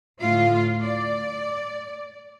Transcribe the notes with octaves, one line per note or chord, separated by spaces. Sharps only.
D2 A2 F4 F5
D5